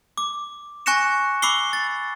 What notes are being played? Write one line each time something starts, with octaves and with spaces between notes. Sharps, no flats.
D6
G#5 C#6 F#6 A#6 C#7 E7
B5 D6 E6 C7 G7
A6